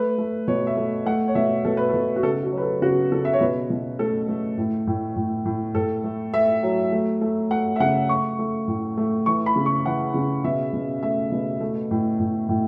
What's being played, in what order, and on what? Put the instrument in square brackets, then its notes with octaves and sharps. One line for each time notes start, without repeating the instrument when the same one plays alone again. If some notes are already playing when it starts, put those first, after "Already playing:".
Already playing: [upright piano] A3 B4
A3
B2 C#5
E5
A3
A3 F#5
C#5
B2 E5
B2 A4
B4
B2 A4
F#4
C#3 A4
F#4
F#3
B4
A4
C#3 F#4
C#3 A4
E5
C#5
B2 B4
B2
A3 A4
A3
A2
A2
A2
A2
A2 A4
A3
A3 E5
F#3
A3
A3
A3 F#5
E5
C#3 F#5
A3 C#6
A3
A2
A3
E3 C#6
B5
C#3
C#6
E3 F#5
C#3
B2 E5
B2
A3 E5
B2
A3
A2
A2
A2